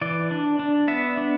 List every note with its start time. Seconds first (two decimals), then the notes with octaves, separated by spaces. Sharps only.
0.01 E3 D5
0.31 D4
0.59 D4
0.88 B3 E5
1.17 D4